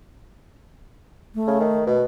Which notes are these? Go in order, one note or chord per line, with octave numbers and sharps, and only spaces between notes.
A3
C#3
D#3
B2